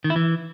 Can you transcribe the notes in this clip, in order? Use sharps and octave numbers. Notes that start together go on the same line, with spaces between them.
D#3
E4
E3